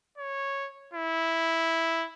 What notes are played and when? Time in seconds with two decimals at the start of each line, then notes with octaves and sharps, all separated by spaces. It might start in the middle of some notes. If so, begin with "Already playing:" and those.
0.18 C#5
0.94 E4